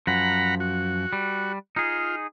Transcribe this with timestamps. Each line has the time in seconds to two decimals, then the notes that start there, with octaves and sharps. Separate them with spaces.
0.07 F#2 F3 F#5 A#5 B5
0.60 F#4
1.13 G3
1.76 D#4 F4 G#4